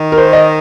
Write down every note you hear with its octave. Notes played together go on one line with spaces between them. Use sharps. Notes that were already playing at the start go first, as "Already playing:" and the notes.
Already playing: D#3
A#4
C5
D#5